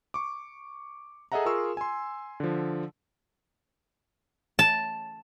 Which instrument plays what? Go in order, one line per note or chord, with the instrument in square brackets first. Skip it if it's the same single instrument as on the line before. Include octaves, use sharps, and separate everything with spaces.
[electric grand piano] C#6 D6
G#4 A4 D#5 E5 F#5 A#5
F4 G#4 A#4 C6 C#6 E6
G#5 C6
D3 F3
[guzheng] A5